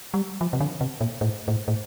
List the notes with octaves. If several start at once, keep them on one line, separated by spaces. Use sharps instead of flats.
G3
F3
C3
D3
C3
A#2
A2
A2
A2